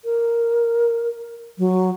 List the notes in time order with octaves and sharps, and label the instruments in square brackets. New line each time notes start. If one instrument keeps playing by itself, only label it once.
[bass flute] A#4
F#3